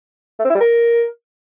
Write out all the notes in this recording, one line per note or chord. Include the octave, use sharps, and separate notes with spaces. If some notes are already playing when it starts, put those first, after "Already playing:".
A3
C4
E4
G3
A#4